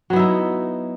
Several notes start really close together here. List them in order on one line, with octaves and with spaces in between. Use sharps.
F#3 B3 E4 D#4